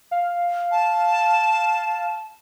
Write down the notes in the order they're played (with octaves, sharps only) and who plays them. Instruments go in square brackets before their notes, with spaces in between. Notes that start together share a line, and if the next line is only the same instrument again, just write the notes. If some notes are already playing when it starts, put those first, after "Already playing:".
[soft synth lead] F5
[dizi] A5